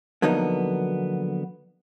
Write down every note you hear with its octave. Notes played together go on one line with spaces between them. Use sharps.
D3 F3 F#3 A#3 B3 D#4